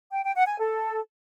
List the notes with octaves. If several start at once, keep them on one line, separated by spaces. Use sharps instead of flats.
G5
G5
F#5
G#5
A4